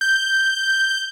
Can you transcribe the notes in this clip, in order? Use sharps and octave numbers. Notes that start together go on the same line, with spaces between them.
G6